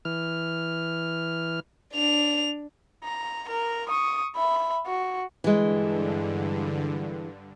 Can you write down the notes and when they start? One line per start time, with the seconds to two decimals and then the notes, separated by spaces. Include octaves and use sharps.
0.05 E3 F6
1.94 D4 F7
3.04 A#5
3.48 A#4 A#5
3.89 C#6 D#6
4.36 E5 B5
4.87 F#4
5.44 G2 D3 E3 G#3